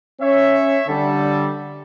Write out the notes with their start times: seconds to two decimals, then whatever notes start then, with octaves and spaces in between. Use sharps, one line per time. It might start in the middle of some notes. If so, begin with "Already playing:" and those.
0.21 C#4 C#5 E5
0.88 D3 G3 A4